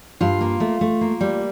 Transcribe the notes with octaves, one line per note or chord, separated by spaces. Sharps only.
G2 F4
A#3
A3
A3
A#3
G3